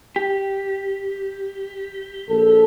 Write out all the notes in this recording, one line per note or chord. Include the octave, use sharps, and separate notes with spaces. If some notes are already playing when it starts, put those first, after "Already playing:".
G4
A#1 A4